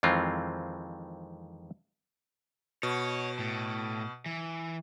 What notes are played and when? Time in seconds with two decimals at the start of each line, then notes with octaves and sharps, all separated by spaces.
0.03 F2 D#3 E3 G#3 C4 F4
2.83 B2 C#5
3.39 A2
4.26 E3